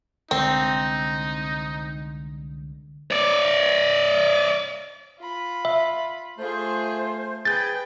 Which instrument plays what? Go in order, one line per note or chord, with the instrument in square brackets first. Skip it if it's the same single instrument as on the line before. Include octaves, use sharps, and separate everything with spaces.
[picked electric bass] C2 D3 G#3 [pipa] C4 [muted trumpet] D#4
[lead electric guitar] C#5 D5
[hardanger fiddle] F4 B5
[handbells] E5
[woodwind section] A3 C5 [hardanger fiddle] F4 G#4
[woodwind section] G#4 [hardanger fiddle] B4 G5 [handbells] G6 A6